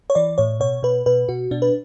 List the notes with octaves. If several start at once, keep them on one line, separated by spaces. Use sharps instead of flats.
C#5
E3 D5
A2 C#5
B2 C#5
B2 B4
B2 B4
B2 F#4
B2 D4
B4